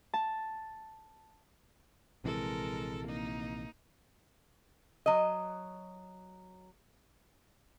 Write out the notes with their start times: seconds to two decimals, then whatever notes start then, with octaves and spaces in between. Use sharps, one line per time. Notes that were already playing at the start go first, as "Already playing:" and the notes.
0.14 A5
2.24 A#1 C3 E3 G#3 A4 A#4
3.04 A#3 D#4
5.06 F#3 D#5